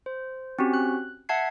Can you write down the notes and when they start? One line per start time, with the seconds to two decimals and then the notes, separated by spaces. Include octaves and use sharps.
0.06 C5
0.59 C4 C#4 F#4 G4
0.74 F#6
1.29 E5 F#5 A5 G#6 C7